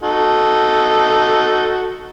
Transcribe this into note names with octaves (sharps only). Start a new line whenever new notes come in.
D#4 F#4 A4